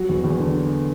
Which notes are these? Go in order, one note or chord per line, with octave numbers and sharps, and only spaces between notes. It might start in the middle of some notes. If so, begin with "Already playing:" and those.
Already playing: F#3 F#4
E2
E2
D3